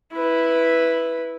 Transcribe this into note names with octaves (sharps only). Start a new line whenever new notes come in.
E4 B4